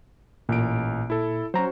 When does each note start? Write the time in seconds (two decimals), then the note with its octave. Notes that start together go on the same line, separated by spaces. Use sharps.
0.49 A1 A#2 D7
1.10 E4 A4
1.54 F#3 C#4 F#4 C5 A#5